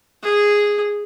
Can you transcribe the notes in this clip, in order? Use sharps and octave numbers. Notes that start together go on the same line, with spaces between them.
G#4